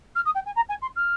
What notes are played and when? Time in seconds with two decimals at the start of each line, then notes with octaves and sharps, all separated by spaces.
0.15 F6
0.25 D#6
0.35 G5
0.46 G#5
0.56 A#5
0.69 G#5
0.82 C6
0.96 F6